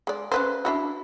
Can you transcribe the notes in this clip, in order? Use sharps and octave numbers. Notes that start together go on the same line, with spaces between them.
G#3 D5
C#4 B4 C5
D4 E4 F#4